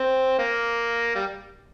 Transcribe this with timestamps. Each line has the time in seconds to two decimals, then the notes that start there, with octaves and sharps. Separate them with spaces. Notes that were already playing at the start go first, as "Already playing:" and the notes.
Already playing: C4
0.39 A#3
1.16 G3